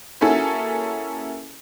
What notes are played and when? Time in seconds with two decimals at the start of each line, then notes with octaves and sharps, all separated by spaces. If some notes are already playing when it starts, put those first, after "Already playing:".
0.21 A#3 C#4 E4 F#4 G#4 A4